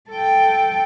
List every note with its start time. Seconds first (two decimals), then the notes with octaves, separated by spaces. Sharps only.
0.11 A4 G5